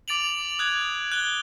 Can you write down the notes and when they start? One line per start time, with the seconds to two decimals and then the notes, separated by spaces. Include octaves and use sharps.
0.08 D6 A6 D7 F7 F#7
0.59 D#6 F#6 G#6
1.12 F#6 G7